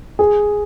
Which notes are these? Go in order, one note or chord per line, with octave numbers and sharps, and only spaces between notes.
G#4